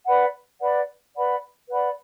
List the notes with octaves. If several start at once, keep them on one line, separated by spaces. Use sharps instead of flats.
B4 D5 F#5 B5
B4 D5 F#5 B5
B4 D5 F#5 B5
B4 D5 F#5 B5